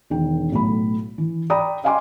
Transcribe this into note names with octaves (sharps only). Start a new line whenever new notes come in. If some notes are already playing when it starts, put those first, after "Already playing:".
E1 D#3 G5
B1 A2 B5
E3
D5 G5 A#5 B5 D#6
D#5 F5 G5 G#5 C6 D6